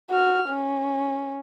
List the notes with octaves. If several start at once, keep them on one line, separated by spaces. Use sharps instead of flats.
F#4 F6
C#4